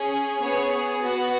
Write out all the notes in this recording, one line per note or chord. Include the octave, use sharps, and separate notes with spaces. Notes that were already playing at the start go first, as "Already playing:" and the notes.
Already playing: C#4 G#4
B3 G#4 C#5
B3 F#4